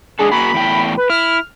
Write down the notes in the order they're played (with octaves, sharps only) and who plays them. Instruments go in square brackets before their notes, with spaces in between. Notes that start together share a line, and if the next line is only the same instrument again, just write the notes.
[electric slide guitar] G#3 D4 A4 [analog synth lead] G#4
[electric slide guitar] A#3 F#4 G#4 [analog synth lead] B5
[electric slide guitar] E2 A2 G5
[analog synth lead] B4
[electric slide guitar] E4 [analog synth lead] F6